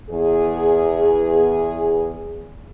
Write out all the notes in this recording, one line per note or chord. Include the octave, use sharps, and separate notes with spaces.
E2 G#4